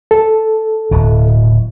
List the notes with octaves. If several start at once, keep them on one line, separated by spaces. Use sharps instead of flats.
A4
D1 B2